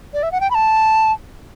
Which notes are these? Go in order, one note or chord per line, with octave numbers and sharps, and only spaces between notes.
D5
E5
F#5
G5
B5
A5